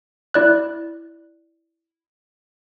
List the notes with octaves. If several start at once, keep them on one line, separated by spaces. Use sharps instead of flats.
E4 D5 F#6